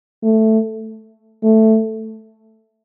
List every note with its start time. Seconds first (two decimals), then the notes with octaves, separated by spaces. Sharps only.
0.23 A3
1.43 A3